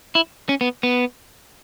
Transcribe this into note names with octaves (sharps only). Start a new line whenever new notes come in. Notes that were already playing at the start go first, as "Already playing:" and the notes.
E4
C#4
B3
B3